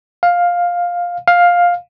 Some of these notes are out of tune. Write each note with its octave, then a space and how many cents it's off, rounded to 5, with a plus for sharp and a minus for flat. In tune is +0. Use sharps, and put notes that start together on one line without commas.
F5 +10
F5 +10